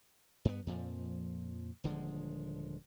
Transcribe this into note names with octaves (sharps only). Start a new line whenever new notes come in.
G2 B3
F2 A#2 F3
D#1 D3 F3 G#3